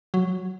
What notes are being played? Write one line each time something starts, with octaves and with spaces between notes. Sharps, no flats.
F#3